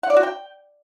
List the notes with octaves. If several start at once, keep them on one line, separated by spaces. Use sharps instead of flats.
F#5
D5
F#4
G5